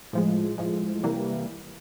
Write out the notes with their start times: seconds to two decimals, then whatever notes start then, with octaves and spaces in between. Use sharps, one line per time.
0.13 A2 F3 G#3
0.58 A2 F3 G#3
1.03 C3 E3 G3 A#3